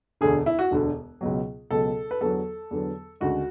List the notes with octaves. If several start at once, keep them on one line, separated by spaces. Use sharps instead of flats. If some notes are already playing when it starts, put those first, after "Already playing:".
E1 D2 D3 G#4
E4
F#4
E1 D2 D3
C#2 B2 F#3
C#2 B2 F#3 A4
B4
E2 D3 F#3 B3 A4
E2 D3 F#3 B3
D2 C#3 G#3 F#4